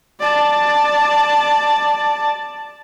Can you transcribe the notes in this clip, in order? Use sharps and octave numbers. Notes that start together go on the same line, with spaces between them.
D5 A5